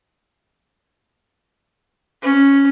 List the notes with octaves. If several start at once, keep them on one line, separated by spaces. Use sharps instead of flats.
C#4